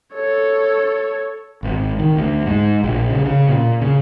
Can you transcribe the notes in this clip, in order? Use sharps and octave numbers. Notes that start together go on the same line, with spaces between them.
A4 C#5
G#1
D#3
D2
G#2
A#1
C#3
C#3
A#2
C#3